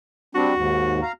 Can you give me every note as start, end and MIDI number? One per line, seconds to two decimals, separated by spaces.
0.35 0.54 55
0.35 0.54 60
0.35 0.54 62
0.35 1.10 66
0.55 1.00 39
0.55 1.00 44
1.02 1.12 77
1.02 1.12 82